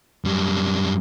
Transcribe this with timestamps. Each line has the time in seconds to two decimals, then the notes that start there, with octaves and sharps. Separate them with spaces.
0.25 F#2 G3